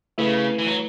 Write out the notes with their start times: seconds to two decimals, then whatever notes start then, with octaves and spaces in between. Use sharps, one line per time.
0.18 C#3 A3 E4 B4 E5
0.59 E3
0.67 F#3